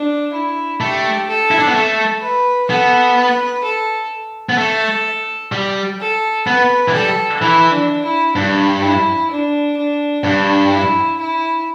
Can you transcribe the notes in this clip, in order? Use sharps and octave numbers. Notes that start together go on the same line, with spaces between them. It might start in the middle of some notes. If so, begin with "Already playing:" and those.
Already playing: D4
E4
A3 G4
A4
E4
D4
B3
A3 A4
B4
B3 A4
B4
A4
B3
A3 A4
G3
A4
B3 B4
E3
G3 A4
E3 E4
D4
E4
G2 D4
E4
D4
D4
G2 D4
E4
E4